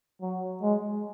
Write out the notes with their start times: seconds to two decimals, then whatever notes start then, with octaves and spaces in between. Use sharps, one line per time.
0.22 F#3
0.63 G#3